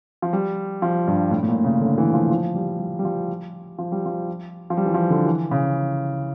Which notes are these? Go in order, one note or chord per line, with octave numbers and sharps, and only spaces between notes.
F3
G3
F3
G2
A2
A2
A#2
C#3
D3
E3
F3
F3
G3
G3
G3
F3
F3
G3
F3
F3
G3
E3
F3
D3
E3
C#3